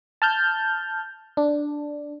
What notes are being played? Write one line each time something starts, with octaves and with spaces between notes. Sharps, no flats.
A5 F6 G6
D4